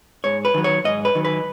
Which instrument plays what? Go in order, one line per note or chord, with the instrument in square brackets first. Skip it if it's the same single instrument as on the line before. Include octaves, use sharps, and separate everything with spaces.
[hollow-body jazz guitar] G#2 C#5
B4
D#3 F#3
C#5
G#2 D#5
B4
D#3 F#3
B4